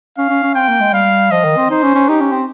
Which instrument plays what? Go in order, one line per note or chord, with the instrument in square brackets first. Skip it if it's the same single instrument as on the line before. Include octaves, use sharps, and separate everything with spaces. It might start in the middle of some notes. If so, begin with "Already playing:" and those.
[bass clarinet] C#4 [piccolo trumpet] F5
[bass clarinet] C#4
C#4
[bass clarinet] C4 [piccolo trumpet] G5
[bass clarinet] A#3
G#3
[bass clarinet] G3 [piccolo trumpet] F5
[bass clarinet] F3 [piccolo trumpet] D#5
[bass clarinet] D#3
C4
[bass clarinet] D#4 [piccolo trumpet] C5
[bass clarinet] C#4
C#4
[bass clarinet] D#4 [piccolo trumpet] G4
[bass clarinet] C#4
C4